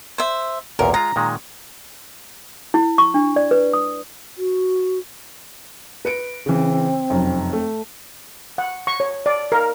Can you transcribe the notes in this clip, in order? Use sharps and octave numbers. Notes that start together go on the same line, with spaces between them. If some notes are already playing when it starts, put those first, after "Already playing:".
C5 E5
B1 E2 A#2 A#4
G#3 F4 A#5
A#2 D#3 G#3
E4
C#6
D4
D5
B4
D#6
F#4
B4 C#7 D7
C#3 E3 C4
F1 F#2
A3
F#5
C#6
C#5
D5
A#4